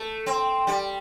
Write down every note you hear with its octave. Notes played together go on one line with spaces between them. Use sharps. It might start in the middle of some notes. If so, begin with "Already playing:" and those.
Already playing: A3
C4
G3